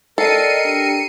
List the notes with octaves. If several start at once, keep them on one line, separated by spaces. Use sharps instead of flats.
A4 A#4 D5 D#5 G5 C7 C#7 D#7
D4 G4 G5